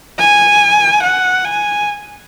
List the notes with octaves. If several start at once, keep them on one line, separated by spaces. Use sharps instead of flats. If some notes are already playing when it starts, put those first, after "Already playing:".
G#5
F#5
G#5